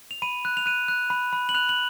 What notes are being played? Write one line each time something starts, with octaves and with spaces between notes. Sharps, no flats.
F7
B5 D#7
F#6
F7
F#6 D#7
F#6
B5
B5
F#7
F#6 F7
F#7